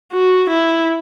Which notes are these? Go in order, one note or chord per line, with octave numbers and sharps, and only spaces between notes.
F#4
E4